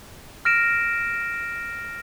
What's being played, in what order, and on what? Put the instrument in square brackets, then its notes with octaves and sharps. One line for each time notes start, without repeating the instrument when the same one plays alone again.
[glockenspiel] F6 A#6 D7 E7